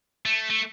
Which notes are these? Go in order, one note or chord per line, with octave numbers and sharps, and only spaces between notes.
A3
A3